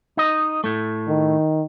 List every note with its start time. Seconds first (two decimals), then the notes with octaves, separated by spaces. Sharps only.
0.17 D#4 D#5
0.64 A2 A3
1.08 D#3